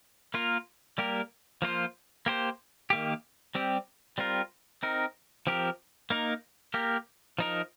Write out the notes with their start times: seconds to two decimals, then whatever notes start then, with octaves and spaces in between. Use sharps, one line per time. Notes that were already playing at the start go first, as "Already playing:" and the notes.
0.34 A#3 F4 A#4
0.98 G3 A#3 G4 A#4
1.62 F3 A#3 F4 C5
2.26 A#3 G4 C5
2.90 D#3 A#3 G4
3.55 G3 C4 G4
4.18 G3 C4 F4 A#4
4.83 C4 D#4 A#4
5.47 F3 C4 G4 A#4
6.10 A#3 D#4 A#4
6.74 A#3 G4 A#4
7.39 F3 D#4 A#4